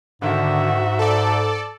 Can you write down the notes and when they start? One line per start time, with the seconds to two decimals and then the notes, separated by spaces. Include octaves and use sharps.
0.22 G#2 D3 D#3 F#4 E5
0.99 A4 D5